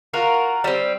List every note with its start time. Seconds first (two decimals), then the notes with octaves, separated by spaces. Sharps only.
0.13 F4 F#4 A#4
0.64 G3 C4